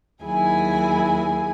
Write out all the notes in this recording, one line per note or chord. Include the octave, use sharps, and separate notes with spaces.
D#2 F#3 E4 G#4 G#5